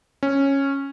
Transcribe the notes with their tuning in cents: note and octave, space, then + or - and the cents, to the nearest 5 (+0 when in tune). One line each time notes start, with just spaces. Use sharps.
C#4 -10